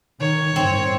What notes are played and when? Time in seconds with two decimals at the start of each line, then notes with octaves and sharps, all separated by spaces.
0.21 D#3 C#5
0.56 G1 A2 D#3 C4